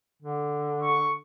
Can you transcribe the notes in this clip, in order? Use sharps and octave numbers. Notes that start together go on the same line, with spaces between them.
D3
C#6